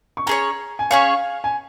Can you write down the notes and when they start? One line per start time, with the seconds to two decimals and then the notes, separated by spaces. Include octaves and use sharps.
0.17 C#6
0.26 C#4 G#4 C#5 A#5
0.79 G#5
0.91 C#4 G#4 C#5 F5
1.44 G#5